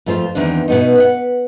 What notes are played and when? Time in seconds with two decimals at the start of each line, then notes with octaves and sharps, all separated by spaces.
0.06 F2 A3 F4 C5
0.35 E2 D#3 C4 D4
0.68 B2 B3 D#4
0.96 B4 E5 F#5